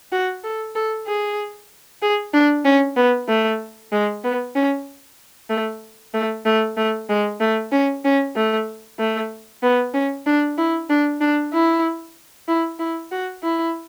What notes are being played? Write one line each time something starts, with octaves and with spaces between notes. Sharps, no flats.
F#4
A4
A4
G#4
G#4
D4
C#4
B3
A3
G#3
B3
C#4
A3
A3
A3
A3
G#3
A3
C#4
C#4
A3
A3
B3
C#4
D4
E4
D4
D4
E4
E4
E4
F#4
E4